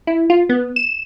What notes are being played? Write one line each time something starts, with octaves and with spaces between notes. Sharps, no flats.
E4
F4
B3
E7